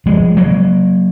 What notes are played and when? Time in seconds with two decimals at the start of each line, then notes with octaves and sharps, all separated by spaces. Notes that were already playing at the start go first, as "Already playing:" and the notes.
0.06 F3 G#3
0.37 F#3 A#3